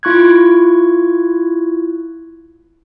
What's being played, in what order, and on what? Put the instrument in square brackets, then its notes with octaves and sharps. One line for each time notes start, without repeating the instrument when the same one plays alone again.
[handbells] E4 F4 C#6 F#6 G#6